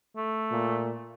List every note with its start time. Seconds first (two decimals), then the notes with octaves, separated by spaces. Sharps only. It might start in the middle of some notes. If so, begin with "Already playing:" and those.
0.16 A3
0.51 A#2